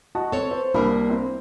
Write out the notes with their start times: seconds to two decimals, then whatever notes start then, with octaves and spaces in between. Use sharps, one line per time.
0.15 F#4 D#5 A5
0.32 C4 A4 C#5
0.51 C5
0.74 C2 A#3 D4 A#4 B5
1.09 C4 E4